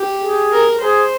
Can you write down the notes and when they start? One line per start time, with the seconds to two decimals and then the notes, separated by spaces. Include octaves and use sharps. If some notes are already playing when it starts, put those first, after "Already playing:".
Already playing: G4
0.23 G#4
0.52 A#4
0.82 G#4 C5